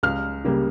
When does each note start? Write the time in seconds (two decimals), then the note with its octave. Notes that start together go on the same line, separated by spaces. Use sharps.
0.03 C#2 F6
0.45 C#3 G3 A#3